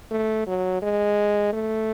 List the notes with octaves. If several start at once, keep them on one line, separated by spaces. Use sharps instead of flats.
A3
F#3
G#3
A3